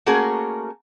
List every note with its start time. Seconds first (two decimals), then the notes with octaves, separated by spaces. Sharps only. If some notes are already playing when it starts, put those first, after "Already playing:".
0.06 A3 A#3 C#4 F#4 G#4 A#4